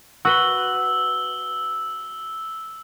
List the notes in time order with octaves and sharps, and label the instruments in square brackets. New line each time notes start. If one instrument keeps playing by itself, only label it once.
[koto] F#4 B4 [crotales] E6 G7